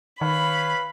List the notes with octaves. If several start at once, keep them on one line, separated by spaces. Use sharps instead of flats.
D#3 B4 C#5 F5 B5